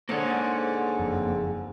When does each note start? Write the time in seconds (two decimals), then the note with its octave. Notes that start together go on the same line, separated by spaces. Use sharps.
0.09 G#2 D3 A#3 A4 C#5
0.99 F#1 F2